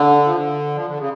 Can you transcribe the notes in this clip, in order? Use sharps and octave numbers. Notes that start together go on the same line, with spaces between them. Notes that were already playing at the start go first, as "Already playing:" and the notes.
Already playing: D3
F3
D3
F3
D3
C#3